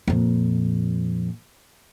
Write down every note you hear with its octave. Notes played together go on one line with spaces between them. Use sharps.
F2 A#2